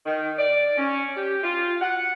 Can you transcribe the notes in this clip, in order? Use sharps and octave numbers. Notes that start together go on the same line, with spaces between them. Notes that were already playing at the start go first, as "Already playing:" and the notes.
D#3
D5
C#4
G4
F4
F#5